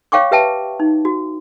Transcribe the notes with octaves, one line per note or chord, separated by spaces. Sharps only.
C#5 F5 G5 C#6 D6
G4 B4 E5 G5 A5
D#4
F#4